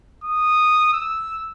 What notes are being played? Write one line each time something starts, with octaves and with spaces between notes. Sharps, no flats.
D#6
E6